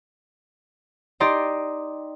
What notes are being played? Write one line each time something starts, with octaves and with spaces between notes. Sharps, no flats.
D#4 G4 D5 D#5 C6